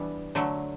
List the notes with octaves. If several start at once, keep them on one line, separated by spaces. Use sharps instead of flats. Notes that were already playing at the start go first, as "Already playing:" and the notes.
Already playing: E3 G3 B3 D4
D3 F#3 A3